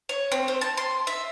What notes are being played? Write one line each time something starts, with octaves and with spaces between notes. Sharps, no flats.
C#5
C4
C5
A5
C6
E5